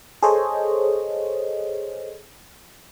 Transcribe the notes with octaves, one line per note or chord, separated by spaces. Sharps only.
G#4 A4 C5 C#5 D#5